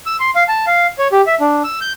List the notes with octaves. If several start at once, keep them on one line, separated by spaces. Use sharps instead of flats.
E6
C6
F5
A5
F5
C#5
G4
E5
D4
E6
G6